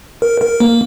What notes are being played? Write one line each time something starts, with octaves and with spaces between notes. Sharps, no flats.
A#4
A#4
A#3